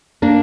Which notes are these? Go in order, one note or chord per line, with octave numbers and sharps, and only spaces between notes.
A#3 D4